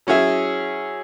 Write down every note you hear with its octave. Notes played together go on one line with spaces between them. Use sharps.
F#3 C#4 E4 G#4 E5